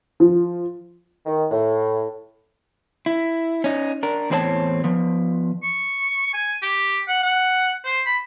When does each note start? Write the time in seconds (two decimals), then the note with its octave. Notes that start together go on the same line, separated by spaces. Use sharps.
0.20 F3
1.26 D#3
1.51 A2
3.06 E4
3.64 C#4 D#4
4.03 D4 A#4
4.30 E2 A2 C4 E4 C#5 A5
4.84 F3 B3
5.62 C#6
6.33 G#5
6.62 G4
7.08 F#5
7.23 F#5
7.84 C5
8.05 B5